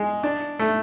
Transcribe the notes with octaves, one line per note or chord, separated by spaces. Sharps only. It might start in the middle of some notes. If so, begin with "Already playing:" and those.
Already playing: G#3
D4
A3